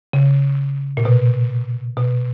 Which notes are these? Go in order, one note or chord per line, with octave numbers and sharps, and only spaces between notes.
C#3
A#2
B2
B2